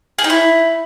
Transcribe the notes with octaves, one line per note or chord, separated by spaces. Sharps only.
G#4
D#4
E4